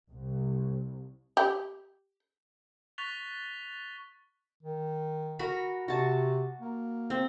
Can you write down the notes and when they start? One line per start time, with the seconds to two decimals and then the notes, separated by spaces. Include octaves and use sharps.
0.10 C2
1.37 G4
2.98 C#6 F#6 A6 B6 F7 G7
4.63 D#3
5.39 F#4 A#4 B5
5.88 C3 F#4 A5
6.61 A#3
7.10 C4